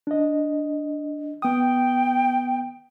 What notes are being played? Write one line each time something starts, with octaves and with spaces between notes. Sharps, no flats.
D4 D#5
B3 G5 D#6